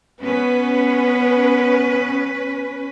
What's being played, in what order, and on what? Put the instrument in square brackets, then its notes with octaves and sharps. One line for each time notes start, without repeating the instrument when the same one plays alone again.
[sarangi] B3 [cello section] C#4 B4